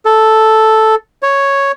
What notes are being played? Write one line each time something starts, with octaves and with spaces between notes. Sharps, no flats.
A4
C#5